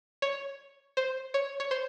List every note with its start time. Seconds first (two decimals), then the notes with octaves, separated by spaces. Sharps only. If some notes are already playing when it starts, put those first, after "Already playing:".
0.22 C#5
0.97 C5
1.34 C#5
1.60 C#5
1.71 C5